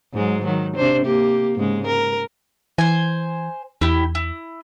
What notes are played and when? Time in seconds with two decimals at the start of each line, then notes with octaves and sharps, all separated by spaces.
0.13 G#2 F#3 G#3
0.44 D#3 F#3
0.76 C3 D4 C5
1.05 A#3 G4
1.57 G#2 C#3 G#3
1.88 A#4
2.78 E3 C5 G#5
3.81 E2 E4 G4
4.15 E4